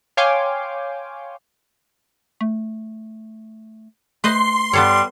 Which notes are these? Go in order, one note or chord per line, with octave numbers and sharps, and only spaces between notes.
C#5 F5 G5 G#5 C6 D6
A3
A3 B4 C5 D#5 C6
G2 G3 B3 A4 C#5